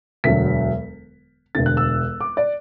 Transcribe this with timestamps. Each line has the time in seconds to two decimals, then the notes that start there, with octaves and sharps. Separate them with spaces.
0.24 E1 D2 D3 F#3 B6
1.55 E1 D2 D3 A6
1.66 F#6
1.77 E6
2.21 D6
2.37 D5